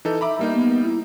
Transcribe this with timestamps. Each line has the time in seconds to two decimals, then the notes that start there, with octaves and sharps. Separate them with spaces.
0.05 E3 D#4 A4
0.21 E5 A#5 B5 D6
0.39 G3 A#3 D#4
0.51 B3
0.83 E4